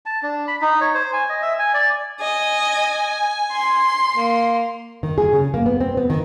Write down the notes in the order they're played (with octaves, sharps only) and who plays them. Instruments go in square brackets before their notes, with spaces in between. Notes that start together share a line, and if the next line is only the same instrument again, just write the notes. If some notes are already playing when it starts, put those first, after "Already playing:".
[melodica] A5
D4
B5
D#4
C#5
C5
G#5
D#5
E5
G#5
D5
[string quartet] D#5 [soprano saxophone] G#5
[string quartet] C6
[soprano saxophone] A#3
[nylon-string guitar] D#3
G#4
C#3
A#3
B3
C4
B3
D#3